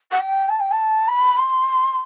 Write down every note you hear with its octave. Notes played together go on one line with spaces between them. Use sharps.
F#5
G5
A5
G5
A5
B5
C6